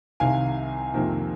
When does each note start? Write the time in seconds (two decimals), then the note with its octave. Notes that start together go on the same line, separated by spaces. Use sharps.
0.20 C2 C3 D#3 F5 G#5
0.94 F2 C3 D#3 A#3